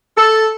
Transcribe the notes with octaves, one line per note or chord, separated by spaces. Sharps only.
A4